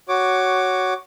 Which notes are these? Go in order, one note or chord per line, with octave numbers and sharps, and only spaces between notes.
F#4 C#5 D6